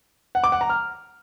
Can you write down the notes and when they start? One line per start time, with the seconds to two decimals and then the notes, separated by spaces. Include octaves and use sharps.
0.35 F#5
0.44 D6
0.52 F#5
0.61 A#5
0.70 F6